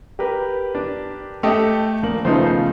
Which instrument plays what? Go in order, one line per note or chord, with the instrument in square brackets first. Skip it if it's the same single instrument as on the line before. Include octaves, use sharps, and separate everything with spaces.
[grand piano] G4 A#4 B4
[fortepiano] D4
[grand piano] A3 [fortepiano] G4 A4 D#5
[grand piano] A#1 A#3 F#7
[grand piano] C#3 F3 A3 [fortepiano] B3 D#4 C5